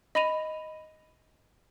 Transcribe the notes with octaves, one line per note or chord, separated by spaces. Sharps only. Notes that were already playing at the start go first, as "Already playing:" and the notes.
D#5 B5 A#6 D#7 F7